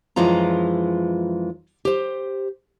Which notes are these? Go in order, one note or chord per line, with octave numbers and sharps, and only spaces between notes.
F#2 E3 F3 G#3 F4 A#5
G4 C5